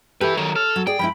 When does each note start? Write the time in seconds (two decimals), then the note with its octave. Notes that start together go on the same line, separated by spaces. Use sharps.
0.21 E4 G4 A4 B4
0.37 D#3 F#3 C#5
0.56 A4 F6
0.76 F#3
0.87 G#4 D5 G5
0.99 F3 G#3 E4 B5